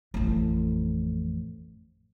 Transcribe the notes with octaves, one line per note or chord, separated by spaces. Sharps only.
A1 F2